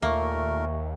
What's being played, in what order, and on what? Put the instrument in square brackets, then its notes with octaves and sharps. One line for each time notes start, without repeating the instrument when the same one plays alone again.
[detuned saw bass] D#2 [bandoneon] A#2 A3 A#4 [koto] A#3 [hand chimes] E5 C#6